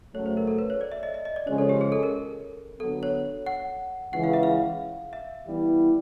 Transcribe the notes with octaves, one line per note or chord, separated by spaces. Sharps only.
F#2 C#3 F#3 A3 C#5
C5
A#4
A4
B4
C#5
D5
E5
D#5
D#5
D#5
D5
C#3 F3 G#3 C#4 C#5
A4
G4
G#4
A4
A#4
D3 F#3 B3 A4
C#5
F#5
C#2 C#3 E3 F#5
F5
E5
F5
E5
E3 G3 B3 E4